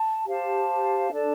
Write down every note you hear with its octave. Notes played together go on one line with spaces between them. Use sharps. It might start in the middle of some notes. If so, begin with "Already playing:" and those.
Already playing: A5
G4 C5 F5 A5
D4 A4 D5 A5